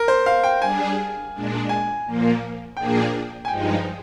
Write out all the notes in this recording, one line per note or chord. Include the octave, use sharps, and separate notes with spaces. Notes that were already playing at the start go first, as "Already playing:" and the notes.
Already playing: A#4
C5
F5
G5
G3 D4 G#4 G#5
A#2 G#3 D4
G#5
A#2 F3 A#3
A#2 F3 A#3 D4 G#4 G5
G#5
G2 F3 G#3 D#4 G5